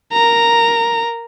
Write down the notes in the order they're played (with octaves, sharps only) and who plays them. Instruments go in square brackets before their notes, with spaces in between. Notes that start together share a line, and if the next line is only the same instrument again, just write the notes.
[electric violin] A#4 A#5